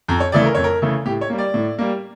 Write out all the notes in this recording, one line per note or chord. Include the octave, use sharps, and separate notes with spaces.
F2 A#5
C#5
C#3 E3 A3 D5
A#4
F2 C#5
A#4
C#3 E3 A3
A2 G4
C#5
G3 A#3
D5
A2
G3 A#3